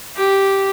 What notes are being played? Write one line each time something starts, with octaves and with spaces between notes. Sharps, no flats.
G4